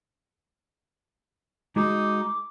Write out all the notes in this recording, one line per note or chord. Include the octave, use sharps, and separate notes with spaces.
G#3 D#4 F#4 G#4 D6